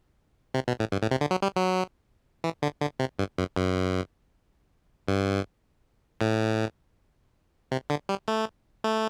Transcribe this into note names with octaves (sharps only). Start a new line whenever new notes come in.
C3
B2
A2
G2
A2
C3
D3
F#3
G3
F#3
E3
D3
D3
C3
G2
F#2
F#2
G2
A2
C3
D3
G3
A3
A3